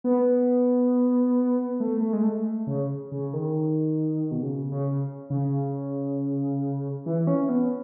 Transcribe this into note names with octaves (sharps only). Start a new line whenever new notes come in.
B3
A3
A3
G#3
A3
C#3
C#3
D#3
B2
C#3
C#3
C#3
E3
C#4
B3